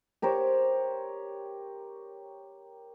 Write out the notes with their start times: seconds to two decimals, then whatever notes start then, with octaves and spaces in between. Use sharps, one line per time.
0.22 G4 A#4 C5 C#5